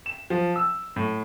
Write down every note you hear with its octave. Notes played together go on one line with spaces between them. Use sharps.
E7
F3
E6
A2